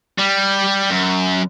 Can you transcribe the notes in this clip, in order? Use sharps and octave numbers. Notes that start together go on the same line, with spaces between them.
G3
F#2